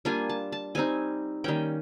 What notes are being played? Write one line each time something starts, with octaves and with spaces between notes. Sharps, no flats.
G3 A#3 D4 F4 G#5
A5
A5
G3 C4 D#4 G#5
D#3 G3 A#3 C#4 G5